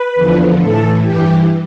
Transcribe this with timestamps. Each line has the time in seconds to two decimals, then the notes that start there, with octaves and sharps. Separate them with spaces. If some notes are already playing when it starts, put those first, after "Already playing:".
Already playing: B4
0.15 E2 D3 F3
0.59 A2 E3 A4
1.02 G2 E3 G4